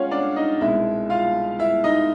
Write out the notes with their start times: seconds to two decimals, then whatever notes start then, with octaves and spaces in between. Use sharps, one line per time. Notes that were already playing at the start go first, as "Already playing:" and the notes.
Already playing: G#3 C#4 F4 C#5 F5 F#5
0.11 D4 D5
0.36 D#4 D#5
0.61 C2 B2 G#3 E4 E5
1.10 F4 F5
1.59 E4 E5
1.84 D#4 D#5